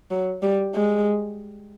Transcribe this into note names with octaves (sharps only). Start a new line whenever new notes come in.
F#3
G3
G#3